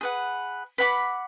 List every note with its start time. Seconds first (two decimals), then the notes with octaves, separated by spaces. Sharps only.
0.01 G#4 B4 F#5
0.78 B4 F#5 B5 D6